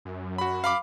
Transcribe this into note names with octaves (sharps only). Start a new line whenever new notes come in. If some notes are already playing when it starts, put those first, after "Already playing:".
F#2
F#4 B5
F5 B5 D6